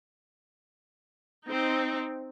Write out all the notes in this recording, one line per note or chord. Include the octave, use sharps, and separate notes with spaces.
C4 D#4